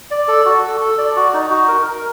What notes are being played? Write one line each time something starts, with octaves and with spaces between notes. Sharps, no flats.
D5
A4
F#4
A4
A4
D5
F#4
D#4
F#4
A#4
A#4